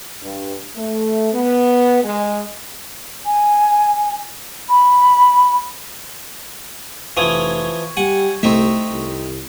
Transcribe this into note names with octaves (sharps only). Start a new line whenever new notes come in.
G2
A3
B3
G#3
G#5
B5
F1 E3 F3 C#6 D#6 G#6
G3 F#5 G#5
C2 A3 C4 D#4 E5 C#6
C2